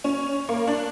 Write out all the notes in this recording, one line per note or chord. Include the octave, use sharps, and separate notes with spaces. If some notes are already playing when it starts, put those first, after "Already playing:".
C#4
A#3
D4